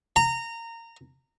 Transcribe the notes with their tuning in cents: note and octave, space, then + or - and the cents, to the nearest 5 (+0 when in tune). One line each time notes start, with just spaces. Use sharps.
A#5 -20